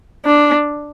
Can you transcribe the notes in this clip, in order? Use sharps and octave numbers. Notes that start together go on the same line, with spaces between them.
D4